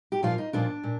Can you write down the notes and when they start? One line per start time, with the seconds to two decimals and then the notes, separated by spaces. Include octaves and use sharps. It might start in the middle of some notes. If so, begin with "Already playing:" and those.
0.12 G4
0.23 A#2 F3 A#3 F4
0.38 D#4
0.53 A#2 F3 A#3 D4
0.84 A#2